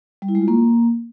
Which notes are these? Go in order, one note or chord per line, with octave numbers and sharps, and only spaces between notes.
G3
E4
G#3
F4
A#3